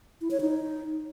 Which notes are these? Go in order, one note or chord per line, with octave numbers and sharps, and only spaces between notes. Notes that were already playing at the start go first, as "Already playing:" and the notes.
E4
C#5
D#4